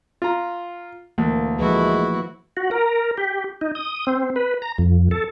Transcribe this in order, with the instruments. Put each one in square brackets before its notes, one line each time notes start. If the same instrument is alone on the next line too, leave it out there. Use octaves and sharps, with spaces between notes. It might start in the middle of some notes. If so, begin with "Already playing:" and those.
[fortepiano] F4 A#5
[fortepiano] D2 [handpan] E3 A#3
[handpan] F3 A3 B4 [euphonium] G#3 [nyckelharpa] E4 F#4
[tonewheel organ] F#4
A#4
G4
D#4
D#6
C4
B4
A#5
F2
A4